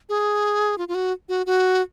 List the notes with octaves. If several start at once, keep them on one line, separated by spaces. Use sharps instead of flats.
G#4
F4
F4
F#4
F#4
F#4